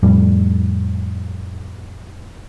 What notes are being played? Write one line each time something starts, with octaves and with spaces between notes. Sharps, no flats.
F2 A2 G3